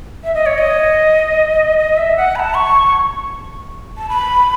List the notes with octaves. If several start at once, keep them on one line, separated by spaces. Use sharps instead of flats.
E5
D#5
C#5
D#5
D#5
E5
F#5
B5
A5
C#6
A5
B5